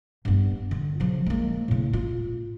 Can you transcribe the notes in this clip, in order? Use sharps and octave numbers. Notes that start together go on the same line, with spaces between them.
G2 B3
D3
C#3 F3
G#3 A#3
A2 C#3
F4